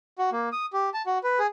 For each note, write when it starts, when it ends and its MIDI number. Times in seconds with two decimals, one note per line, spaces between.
0.18 0.30 66
0.32 0.49 58
0.52 0.66 87
0.73 0.90 67
0.94 1.02 81
1.06 1.18 66
1.24 1.39 71
1.39 1.47 68